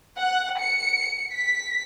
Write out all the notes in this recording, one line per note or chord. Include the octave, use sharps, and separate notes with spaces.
F#5
C#7
B6